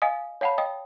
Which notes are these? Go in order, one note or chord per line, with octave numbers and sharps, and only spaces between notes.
D#5 F5 G#5 D#6
C#5 F5 F#5 A5 B5
D#5 G5 D#6